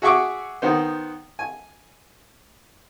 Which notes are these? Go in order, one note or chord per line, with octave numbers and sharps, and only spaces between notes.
F#4 G#4 E5 F#5 C#6 D6
D#3 B3 C5
G#5